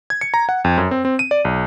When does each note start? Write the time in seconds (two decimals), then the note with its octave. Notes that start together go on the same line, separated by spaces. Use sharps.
0.10 G#6
0.21 C#7
0.34 A#5
0.49 F#5
0.64 F2
0.78 F#2
0.91 C4
1.05 C4
1.19 D#7
1.31 D5
1.45 B1